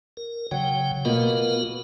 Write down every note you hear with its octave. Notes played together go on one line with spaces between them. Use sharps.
A#4
C#3 F#3 G5
B2 A#3 B3 F4 A#4